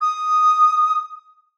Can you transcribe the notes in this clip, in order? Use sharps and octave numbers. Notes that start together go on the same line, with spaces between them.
D#6